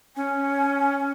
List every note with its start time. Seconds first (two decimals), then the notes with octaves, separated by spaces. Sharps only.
0.17 C#4 G#5